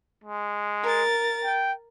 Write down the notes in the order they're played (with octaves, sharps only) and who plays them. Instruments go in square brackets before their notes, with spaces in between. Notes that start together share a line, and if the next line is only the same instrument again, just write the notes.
[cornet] G#3
[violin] A#4 A6
[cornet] G5